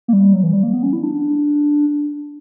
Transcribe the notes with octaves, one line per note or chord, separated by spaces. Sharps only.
A#3
G3
F#3
E3
G3
A#3
B3
C#4
E4
D4